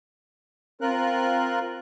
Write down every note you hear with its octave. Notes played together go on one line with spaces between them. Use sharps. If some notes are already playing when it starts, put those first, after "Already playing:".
C4 F4 A#4 F#6